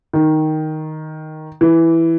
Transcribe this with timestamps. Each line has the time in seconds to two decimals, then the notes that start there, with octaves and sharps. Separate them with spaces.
0.13 D#3
1.61 E3